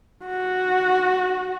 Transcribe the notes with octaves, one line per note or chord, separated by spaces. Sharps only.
F#4